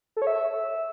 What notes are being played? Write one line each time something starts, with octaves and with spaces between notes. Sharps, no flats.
A4
C#5
E5